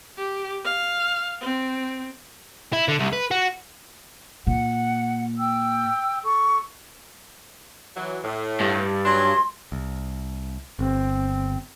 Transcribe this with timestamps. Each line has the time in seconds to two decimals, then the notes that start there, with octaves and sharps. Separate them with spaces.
0.17 G4
0.65 F5
1.41 C4
2.73 E4
2.88 D3
3.00 C2
3.13 B4
3.31 F#4
4.47 A#2 F#5
5.38 G5 E6
6.24 A4 C#6
7.96 E3 F#3
8.23 A2
8.61 G2
9.05 F#3 C#4 D4 C6
9.72 C2
10.79 G1 C4